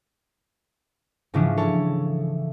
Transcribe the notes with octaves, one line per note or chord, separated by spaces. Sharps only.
G#2 C#3 E3 F3 C#4 D4
E4 A4 C#5